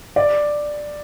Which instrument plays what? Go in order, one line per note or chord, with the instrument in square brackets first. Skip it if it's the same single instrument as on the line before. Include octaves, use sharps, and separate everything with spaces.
[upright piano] D5